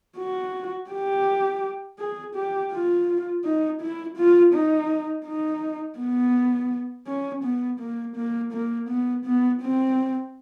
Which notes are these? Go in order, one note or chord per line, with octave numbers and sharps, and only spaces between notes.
F#4
G4
G#4
G4
F4
D#4
E4
F4
D#4
D#4
B3
C#4
B3
A#3
A#3
A#3
B3
B3
C4